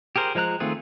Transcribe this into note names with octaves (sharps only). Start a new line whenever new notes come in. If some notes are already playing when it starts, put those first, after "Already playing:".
G4 G#4 A#4 C5
F3 G#3 C5 A#5 F#6
D#3 A3 C4 F4 G#4